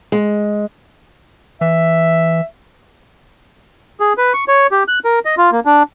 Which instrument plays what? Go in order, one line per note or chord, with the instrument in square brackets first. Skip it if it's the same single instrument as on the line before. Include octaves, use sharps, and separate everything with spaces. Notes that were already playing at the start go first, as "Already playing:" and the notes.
[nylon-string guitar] G#3
[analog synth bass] E3 [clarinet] E5
[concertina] G#4
B4
C#6
C#5
G4
F#6
A#4
D#5
F4
A#3
D4